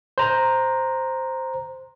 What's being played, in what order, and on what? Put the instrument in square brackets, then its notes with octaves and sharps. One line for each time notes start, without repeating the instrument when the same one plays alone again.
[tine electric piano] C5 A#5